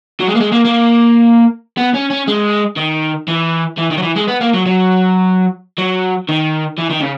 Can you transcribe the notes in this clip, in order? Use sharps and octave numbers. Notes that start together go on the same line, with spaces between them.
F#3
G#3
A#3
G#3
A#3
A#3
B3
C#4
C#4
G#3
D#3
E3
E3
D#3
F#3
E3
G#3
B3
A#3
F#3
F#3
F#3
D#3
E3
D#3
C#3